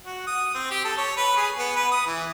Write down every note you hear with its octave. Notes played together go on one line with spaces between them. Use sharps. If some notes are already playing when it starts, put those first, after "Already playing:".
F#4
D#6
C4
G4
A4
C#5
B4
G#4
B3
B4
D#6
E3